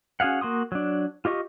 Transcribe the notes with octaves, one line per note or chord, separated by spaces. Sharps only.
C#4 F#4 G#4 F5 F#5
A#3 F#4 C6 D#6
F#3 D4
F4 G4 D#5 C#6